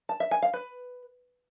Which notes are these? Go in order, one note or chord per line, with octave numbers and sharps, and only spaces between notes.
A5
E5
G#5
F5
B4